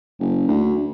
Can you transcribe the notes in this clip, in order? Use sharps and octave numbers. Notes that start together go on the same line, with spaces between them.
F#1
D2